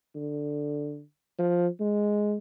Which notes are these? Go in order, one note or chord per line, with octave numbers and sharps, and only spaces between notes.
D3
F3
G#3